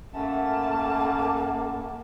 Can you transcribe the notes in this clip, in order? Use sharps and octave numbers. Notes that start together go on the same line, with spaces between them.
F#2 A3 A#3 F#5 A5